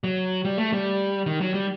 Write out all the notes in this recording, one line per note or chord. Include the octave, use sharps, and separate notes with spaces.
F#3
G3
A3
G3
D#3
F#3
G3